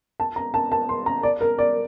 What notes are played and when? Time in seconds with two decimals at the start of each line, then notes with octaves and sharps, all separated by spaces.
0.20 A5
0.36 A#5
0.54 A5
0.72 A5
0.89 C6
1.06 A#5
1.23 D5
1.41 A#4
1.59 D5